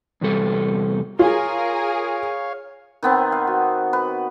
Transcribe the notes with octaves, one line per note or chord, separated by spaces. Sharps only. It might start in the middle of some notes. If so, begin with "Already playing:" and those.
E2 C3 G3 A4
F4 G#4 A#4 C#5 F5
D#3 B3 C4
F5
F#4
B4